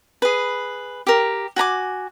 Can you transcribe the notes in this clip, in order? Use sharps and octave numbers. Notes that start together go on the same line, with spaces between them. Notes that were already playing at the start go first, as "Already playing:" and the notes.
G#4 B4
G4 A#4
F#4 G#5 A#5 D6